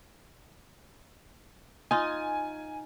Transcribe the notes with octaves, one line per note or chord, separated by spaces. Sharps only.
D#4 F4 G#5